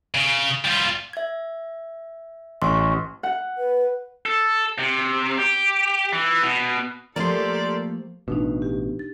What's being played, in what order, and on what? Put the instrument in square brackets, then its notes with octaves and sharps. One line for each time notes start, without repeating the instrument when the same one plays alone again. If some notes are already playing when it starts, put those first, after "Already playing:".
[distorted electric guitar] C#3
G3 F4
[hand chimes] E5 G#6
[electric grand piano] A1 [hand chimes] C6 C#6
[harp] F#5
[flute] B4
[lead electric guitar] A4
C3
G4
E3
B2
[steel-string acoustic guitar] F3 A3 A#3 [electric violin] G4 A4 [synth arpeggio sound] A#4 C6 [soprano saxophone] D5
[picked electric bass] A1 B2 [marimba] D4 D#4
[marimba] G4
A6